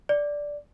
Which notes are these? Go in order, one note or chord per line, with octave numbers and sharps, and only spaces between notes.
D5